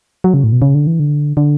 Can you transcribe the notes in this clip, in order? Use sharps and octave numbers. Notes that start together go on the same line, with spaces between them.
F#3
C#3
A2
B2
C#3
D3
E3
D3
D3